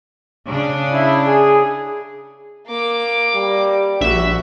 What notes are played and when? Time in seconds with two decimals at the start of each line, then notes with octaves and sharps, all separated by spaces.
0.47 C#3 D4
0.92 E4
1.27 G#4
2.67 A#3 D6
3.34 G3
4.01 A#1 F#4 E5